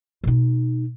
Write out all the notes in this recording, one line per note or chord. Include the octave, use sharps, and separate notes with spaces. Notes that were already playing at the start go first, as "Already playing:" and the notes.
B2 D#4